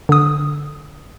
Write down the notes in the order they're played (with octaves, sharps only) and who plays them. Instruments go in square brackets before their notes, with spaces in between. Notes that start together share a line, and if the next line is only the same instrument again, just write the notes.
[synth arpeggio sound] D3 D#6